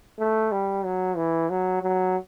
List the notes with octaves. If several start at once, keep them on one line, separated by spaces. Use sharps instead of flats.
A3
G3
F#3
E3
F#3
F#3